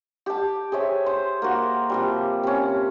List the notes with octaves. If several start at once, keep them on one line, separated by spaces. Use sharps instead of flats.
G4 A5
G#4 C5 C#5 E5
C5
A#3 F#4
C3 F3 G3
C3 C#4